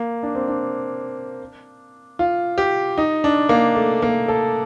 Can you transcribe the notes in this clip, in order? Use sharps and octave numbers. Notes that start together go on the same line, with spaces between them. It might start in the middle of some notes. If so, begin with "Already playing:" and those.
Already playing: A#3
D4
C4
D4
F4
G4
D#4
D4
A#3
A3
A#3
A4